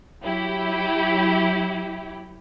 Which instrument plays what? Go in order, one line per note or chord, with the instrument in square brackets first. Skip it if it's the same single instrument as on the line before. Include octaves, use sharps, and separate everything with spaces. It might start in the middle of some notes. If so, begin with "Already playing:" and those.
[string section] F#3 E4 G4